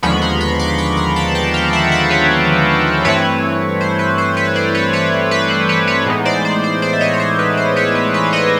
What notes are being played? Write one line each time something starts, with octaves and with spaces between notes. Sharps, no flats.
D#2 D3 F3 G#3 B3 B5 C#6
A#5 C6
B5 C#6
C6 D6
B5 C#6
A#5 C6
A5 B5
G5 A5
F5 G5
E5 F#5
E5 F#5
B4 C#5
G2 E3 A3 C4 E4 B4 C#5
C5
B4
C5
B4 C#5
C5 D5
B4 C#5
B4 C#5
B4
C5
B4 C#5
B4 C#5
A2 E3 G#3 B3 D#4
C5 D5
C5
C5
C5 D5
E5
C#5 D#5
C#5
C5
B4
C5
B4 C#5
B4
B4
C#5 D#5